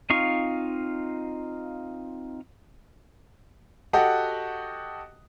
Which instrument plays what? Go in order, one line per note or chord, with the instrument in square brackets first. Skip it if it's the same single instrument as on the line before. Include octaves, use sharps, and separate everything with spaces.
[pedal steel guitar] C4 D#4 F4 F5 C#6
[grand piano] F#4 G4 A4 D#5 F#5